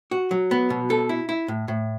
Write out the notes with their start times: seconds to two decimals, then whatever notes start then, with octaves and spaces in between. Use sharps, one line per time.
0.11 F#4
0.31 F#3
0.51 B3
0.70 B2
0.90 A4
1.09 E4
1.29 E4
1.48 A2
1.68 A2